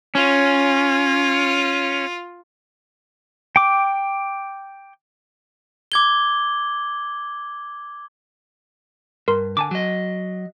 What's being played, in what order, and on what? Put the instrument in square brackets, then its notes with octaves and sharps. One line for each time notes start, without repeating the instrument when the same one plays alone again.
[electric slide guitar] C#4 [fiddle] F4
[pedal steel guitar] G5 D6
[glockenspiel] D6 G#6 G7
[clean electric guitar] G2 [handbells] A#4 C6
[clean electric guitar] D3 [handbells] G#5 A5 D6
[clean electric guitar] F#3 D#5